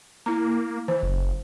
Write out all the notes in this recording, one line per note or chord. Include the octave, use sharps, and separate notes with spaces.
A#3 E4 A#5
E3 C5
F#1